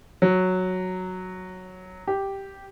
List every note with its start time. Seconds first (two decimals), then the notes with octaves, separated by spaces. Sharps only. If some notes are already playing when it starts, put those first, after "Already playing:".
0.22 F#3
2.08 G4